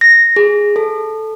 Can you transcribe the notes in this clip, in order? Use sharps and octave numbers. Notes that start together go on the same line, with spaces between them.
A#6
G#4
A4